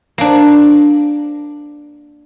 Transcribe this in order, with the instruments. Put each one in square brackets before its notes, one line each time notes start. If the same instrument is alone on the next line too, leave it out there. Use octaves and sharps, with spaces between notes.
[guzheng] A#3 D4